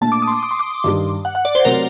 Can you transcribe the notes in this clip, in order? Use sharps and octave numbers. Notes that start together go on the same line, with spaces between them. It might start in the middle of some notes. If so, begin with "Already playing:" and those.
A#2 A3 D4 A5
D6
D#6
C6
D6
D6
C6
D6
G2 D#3 G3
F#5
F#5
D5
C5
C3 F#3 A3 A#4